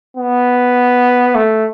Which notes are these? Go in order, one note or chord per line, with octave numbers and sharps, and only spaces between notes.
B3
A3